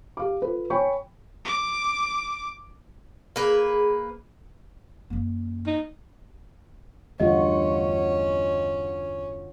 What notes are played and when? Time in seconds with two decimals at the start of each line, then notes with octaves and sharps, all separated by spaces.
0.17 G4 F5 D6
0.42 F4 A4 B4
0.70 C#5 G5 G#5 B5 C#6
1.45 D6
3.36 A#3 G#4 B4
5.10 F#2 A#3
5.67 D#4
7.20 E2 G2 D3 A3 C#4 F4 F#4 D#5